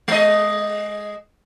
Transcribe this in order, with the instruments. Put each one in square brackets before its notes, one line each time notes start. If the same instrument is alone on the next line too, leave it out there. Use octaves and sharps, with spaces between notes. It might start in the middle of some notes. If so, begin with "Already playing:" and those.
[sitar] G#3 D#5